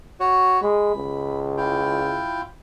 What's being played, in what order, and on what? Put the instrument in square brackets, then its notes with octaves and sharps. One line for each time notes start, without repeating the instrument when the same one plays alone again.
[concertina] F#4 C#5
[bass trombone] G#3 [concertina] B5
[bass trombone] C#2
[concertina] E4 F4 G5